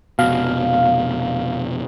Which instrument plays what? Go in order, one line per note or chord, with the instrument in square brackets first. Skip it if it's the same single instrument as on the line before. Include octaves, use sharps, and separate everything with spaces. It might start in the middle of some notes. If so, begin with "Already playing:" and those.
[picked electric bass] F1 B2 [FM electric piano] F5